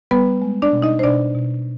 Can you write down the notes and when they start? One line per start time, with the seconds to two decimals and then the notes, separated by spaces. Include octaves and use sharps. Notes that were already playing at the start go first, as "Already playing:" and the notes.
0.11 G3 B3 B4
0.42 G#3
0.62 D4 D5
0.73 B2
0.82 D#4 D#5
0.99 C5
1.03 B2 D4 D5
1.35 B2